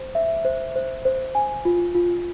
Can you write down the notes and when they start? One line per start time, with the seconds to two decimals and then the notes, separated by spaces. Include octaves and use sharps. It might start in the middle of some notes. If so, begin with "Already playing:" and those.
Already playing: C5
0.15 E5
0.45 C5
0.76 C5
1.05 C5
1.35 G#5
1.65 F4
1.95 F4